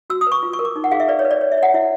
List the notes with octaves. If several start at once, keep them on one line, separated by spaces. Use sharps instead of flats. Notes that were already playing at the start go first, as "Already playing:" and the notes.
F#4 E6
D#6
B4 C#6
F4
C#6
A#4
D6
D#4
F#5
G#4 F5
E5
B4 D5
C#5
B4
D5
C#5
E5
C#5
F#5
E4 E5